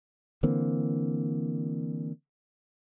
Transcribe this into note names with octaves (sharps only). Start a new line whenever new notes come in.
D3 E3 A#3 C4